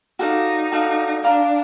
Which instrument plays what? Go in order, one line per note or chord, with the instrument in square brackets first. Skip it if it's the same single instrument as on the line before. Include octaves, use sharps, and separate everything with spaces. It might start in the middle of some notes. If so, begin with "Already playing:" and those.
[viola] D#4 [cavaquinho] F#4 A4 D5 F5
[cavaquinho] F#4 A4 D5 F5
[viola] D4 [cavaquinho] D5 F5 A#5